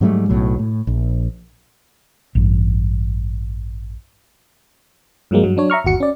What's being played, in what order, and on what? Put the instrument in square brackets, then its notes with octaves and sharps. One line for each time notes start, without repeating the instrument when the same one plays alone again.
[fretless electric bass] G#2 F#3 G3 A3
B1 A2 F#3
A2
A#1
A1 G2
[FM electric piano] G2 F3 F#3 G#3 A#3
G2 F#3
F#3 D4 C#5
E5 A#5 C#6 F6
G1 D#2 F#4 C#7
C#4 D5